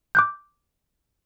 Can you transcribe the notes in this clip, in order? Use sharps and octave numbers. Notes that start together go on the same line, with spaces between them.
D6 F#6 G6